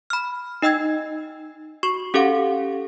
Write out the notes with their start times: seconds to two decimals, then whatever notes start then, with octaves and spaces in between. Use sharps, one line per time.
0.10 B5 F6
0.62 D#4 D#5 G5 E6 G#6
1.83 F#4 C#6
2.14 C#4 G4 A4 F5 F#5